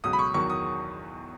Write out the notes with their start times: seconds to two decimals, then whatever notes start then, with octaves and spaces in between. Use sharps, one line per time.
0.04 C#2 B2 F#3 D#6
0.13 B5
0.19 C#6
0.34 E2 D#3 F#3 C#6
0.50 D#6